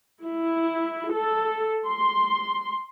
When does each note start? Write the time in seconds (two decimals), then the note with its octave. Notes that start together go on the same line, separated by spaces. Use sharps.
0.23 E4
1.11 A4
1.87 C6